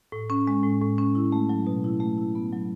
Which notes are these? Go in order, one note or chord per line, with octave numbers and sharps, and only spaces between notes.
A2
C#4
G#3
A2
A2
C#4
E4
A3
F#3
B2
E4
A3
E4
B3
F#3